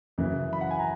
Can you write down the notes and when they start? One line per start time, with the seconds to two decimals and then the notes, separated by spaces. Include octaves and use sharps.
0.18 F#2 C#3 E3
0.53 B5
0.61 F#5
0.71 G#5
0.79 A#5